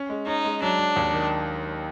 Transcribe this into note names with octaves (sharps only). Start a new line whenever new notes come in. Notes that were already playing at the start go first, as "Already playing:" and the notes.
Already playing: C#4
G#3
C#4 D#4
G#3
F#3 D4
F#3
D#2
D#3